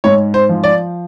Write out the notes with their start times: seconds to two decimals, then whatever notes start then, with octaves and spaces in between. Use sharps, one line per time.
0.04 G#2 C#5
0.34 C5
0.49 F3
0.64 D5